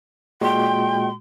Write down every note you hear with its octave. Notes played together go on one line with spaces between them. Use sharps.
A#2 G#3 F#4 G5 C6